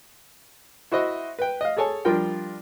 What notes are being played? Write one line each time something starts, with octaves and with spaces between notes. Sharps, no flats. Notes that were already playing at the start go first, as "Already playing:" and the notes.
E4 F#4 C5 D#5 E5
B4 G5
D#5 F5
G#4 A4 C#5 G#5 A5
F3 G3 D4 F4 A#4 G5